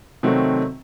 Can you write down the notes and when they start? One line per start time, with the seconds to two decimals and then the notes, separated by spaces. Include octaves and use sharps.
0.23 C3 D#3 F#3 A3 C4 F#4